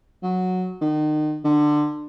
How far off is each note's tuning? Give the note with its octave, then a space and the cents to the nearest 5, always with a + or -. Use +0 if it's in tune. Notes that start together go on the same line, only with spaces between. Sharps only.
F#3 -10
D#3 -35
D3 +20